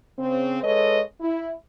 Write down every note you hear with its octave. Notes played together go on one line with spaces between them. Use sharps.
C#3 C4
G#3 A4 B4 C#5 D#5
E4